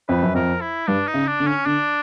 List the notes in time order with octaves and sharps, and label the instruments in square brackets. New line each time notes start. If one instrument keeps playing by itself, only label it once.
[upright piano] F2 [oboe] B4
[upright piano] F#2
[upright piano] F2 [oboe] A#4
[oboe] E4
[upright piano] G2 [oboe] D4
[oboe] D#4
[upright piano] C#3
[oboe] D4
[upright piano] D3
[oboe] C#4
[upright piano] D3 [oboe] D4